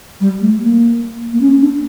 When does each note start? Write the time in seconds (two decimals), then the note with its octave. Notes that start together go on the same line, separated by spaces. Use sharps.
0.21 G3
0.41 A3
0.60 A#3
1.33 A#3
1.41 C#4
1.62 D4